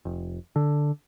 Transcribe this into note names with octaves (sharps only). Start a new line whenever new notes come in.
F1
D3